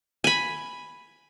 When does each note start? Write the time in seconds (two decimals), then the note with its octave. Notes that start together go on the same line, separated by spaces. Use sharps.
0.24 G#5 B5